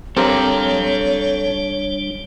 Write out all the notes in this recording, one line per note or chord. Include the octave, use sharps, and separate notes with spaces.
G3 C4 D4 G4 A4 A#4 C#5 F5